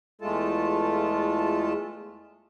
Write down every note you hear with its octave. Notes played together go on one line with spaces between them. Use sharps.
E2 G#3 A3 F4 A4 A5